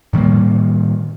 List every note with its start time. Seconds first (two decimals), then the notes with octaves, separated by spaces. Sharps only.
0.13 A2 D#3 G3 A#3